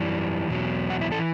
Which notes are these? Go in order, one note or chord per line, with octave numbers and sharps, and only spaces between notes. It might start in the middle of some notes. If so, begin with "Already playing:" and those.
Already playing: F#2 E3 G3
E2 B2 F#3
F#4
E4
E3 A4